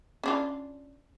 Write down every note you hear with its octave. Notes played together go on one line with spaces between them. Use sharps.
C#4 D4 F4